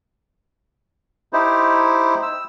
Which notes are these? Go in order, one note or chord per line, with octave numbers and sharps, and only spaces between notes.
D#4 E4 G4 C5
E6